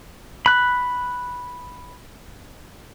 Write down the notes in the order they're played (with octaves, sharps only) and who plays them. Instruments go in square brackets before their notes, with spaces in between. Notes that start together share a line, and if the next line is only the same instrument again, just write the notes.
[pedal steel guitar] B5 F#6